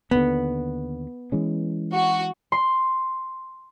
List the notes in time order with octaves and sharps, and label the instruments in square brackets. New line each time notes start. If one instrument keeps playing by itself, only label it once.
[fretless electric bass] D#2 D3 [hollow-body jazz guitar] B3
[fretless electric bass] E3 G#3 C#4
[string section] F#4
[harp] C6